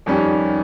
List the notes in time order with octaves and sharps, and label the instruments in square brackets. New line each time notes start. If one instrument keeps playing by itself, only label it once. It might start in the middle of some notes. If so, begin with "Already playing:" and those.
[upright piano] F2 D#3 G3 C#4 G4